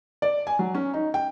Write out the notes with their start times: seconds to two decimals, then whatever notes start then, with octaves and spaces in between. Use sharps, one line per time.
0.22 D5
0.47 G#5
0.59 F#3
0.75 C#4
0.94 D#4
1.14 G5